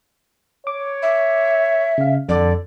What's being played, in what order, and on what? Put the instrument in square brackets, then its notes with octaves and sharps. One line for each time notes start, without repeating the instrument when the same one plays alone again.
[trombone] C#5 [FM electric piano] D6
[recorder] E5
[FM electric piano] C#3 F5
[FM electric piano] F2 [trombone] D3 [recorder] D5